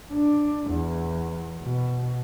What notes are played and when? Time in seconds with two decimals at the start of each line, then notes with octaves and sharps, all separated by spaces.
0.12 D4
0.70 E2
1.62 B2